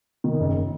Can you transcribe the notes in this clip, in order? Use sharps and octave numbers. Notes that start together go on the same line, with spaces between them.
D#3
F#1